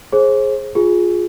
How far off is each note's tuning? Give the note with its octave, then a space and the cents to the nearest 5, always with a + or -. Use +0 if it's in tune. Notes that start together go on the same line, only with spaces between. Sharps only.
G#4 +15 C5 +40
F4 +20 G#4 +0